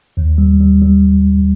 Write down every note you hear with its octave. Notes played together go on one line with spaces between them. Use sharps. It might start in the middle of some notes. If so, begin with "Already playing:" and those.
D#2
G3
G3
G3